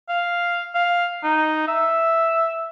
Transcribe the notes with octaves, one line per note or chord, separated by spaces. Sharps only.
F5
F5
D#4
E5